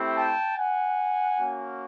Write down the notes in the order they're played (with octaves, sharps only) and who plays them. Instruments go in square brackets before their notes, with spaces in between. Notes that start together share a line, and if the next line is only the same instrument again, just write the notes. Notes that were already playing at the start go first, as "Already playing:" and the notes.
Already playing: [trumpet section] A3 C4 E4 G4
G5 A5
F#5 G#5
A#3 C#4 F#4